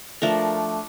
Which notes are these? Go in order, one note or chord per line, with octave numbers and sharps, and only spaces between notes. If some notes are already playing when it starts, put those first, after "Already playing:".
F3 A3 D4 A#4